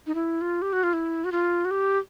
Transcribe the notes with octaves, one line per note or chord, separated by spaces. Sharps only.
D#4
E4
F4
G4
F#4
F4
E4
F#4
F4
F#4
G4